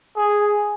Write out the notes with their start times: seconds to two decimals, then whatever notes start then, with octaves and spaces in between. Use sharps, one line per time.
0.16 G#4